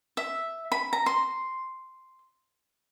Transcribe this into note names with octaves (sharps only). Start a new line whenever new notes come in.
E5
B5
A#5
C6